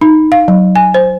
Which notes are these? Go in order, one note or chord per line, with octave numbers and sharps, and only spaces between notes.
D#4
F5
F#3
G#5
C5